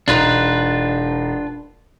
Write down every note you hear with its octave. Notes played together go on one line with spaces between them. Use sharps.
E1 D4 D#4 F4 B4 F7